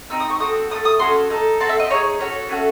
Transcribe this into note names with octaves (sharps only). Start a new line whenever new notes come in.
C4 D#4 E6
D#6
C#6
C4 F#4 A4 D#6
D#4 A4 D#6
A3
D#6
C#4 F#4 A4 C6
D#4 A4
C4 F#4 A4 A5
E5
D#5
D#4 G#4 C#5
C#4 F#4 A4 C#5
A3 C#4 F#4 A4